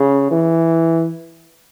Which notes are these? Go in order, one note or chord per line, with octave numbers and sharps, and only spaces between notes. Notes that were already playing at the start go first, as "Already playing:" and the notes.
Already playing: C#3
E3